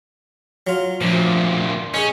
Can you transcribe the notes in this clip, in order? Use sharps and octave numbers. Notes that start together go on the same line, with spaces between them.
F#3 F4
D2 A#2 F3
C#4 D#4 G#4